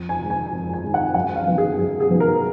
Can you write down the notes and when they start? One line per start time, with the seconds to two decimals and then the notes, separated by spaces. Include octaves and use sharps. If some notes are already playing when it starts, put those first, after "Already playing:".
Already playing: F2
0.09 G#5
0.20 D#3 G#3
0.30 G#5
0.51 F2
0.73 G#5
0.83 D#3 G#3
0.94 F#5
1.14 F#2 F#5
1.36 F5
1.47 D#3 F#3 B3
1.58 G#4
1.78 F#2 G#4
2.00 G#4
2.10 D#3 F#3 B3
2.20 A#4